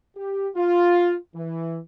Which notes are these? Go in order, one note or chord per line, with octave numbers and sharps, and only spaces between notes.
G4
F4
E3